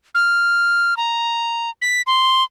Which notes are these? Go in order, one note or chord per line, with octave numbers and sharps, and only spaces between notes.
F6
A#5
B6
C6